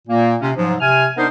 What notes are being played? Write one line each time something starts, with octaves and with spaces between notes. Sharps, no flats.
A#2 A#3
C3 C#4
G#2 F3 F#3
C3 G#5 F6
B3 D4 D#4 A#4 C5